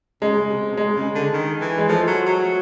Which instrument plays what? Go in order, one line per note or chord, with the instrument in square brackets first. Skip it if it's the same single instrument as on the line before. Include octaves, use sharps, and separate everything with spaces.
[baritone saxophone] C#3 [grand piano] G#3
[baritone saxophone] C3
B2
[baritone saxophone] C3 [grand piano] G#3
[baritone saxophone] C#3
D3
D#3
E3
[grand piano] G#3
[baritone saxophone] F3 [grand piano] A3
[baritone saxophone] F#3
F#3